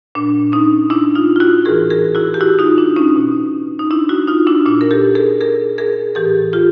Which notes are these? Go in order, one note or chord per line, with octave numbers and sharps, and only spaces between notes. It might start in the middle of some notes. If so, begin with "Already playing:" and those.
A#2 D4
C#4 D#4
D4 E4
D#4 F4
F4
E4 F#4
A2 E3 G#4 A#4
G#4 A#4
E4 F#4
G4
E4 F#4
D#4 F4
D4 E4
C#4 D#4
B2
D#4
D4 E4
E4 F#4
D#4 F4
D4 E4
A#2 D4 E4
A#4
G4 A4
G#4 A#4
G#4 A#4
G#4 A#4
A2 E3 G4 A4
F4 G4